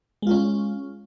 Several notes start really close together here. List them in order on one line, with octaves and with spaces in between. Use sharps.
G#3 F4 C#4